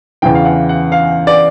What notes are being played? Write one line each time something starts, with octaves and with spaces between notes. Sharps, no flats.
E2 C#3 E3 G5
F5
F#5
F#5
F5
D5